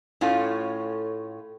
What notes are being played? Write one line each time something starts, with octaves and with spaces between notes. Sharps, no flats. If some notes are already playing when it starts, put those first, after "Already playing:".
A2 A3 C#4 F4